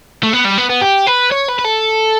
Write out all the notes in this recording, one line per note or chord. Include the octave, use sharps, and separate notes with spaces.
A3
B3
G3
B3
B3
G4
B4
C#5
B4
B4
A4